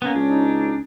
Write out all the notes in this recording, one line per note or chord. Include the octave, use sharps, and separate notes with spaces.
A#3 B3 C#4
C#2 D4
D#4